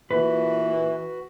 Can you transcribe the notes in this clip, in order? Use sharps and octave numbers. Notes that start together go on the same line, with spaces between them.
A#2 E3 F#4 B4